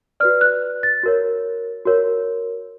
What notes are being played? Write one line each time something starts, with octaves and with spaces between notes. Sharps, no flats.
F#4 B4 D5 F6
F#6
A6
F#4 A#4 C#5
F#4 A#4 C#5